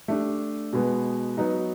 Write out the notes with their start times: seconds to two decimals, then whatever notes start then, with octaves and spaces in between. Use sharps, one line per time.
0.08 A3 D4 G4
0.73 B2 G#3 B3
1.37 F#3 B3 D#4 F#4